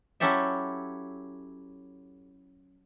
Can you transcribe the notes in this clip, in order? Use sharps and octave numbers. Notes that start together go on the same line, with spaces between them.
F#3 C#4 E4 G4 A4 E5